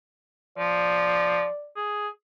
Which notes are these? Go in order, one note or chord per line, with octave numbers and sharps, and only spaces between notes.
F3 D5
G#4